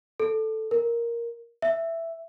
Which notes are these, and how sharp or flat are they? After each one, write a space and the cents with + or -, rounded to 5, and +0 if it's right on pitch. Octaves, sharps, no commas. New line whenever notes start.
A4 +0
A#4 +5
E5 +5